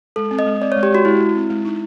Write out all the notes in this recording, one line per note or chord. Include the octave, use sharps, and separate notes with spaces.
G#3 A4
C4
D#5
G#3
C4 D5
G#3 C#5
G4
G#3 F#4
G#3 E4
G#3
C4
G#3
D#4